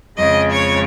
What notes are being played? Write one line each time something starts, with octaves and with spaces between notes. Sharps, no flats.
F2 C#3 G#3 D#5
C#5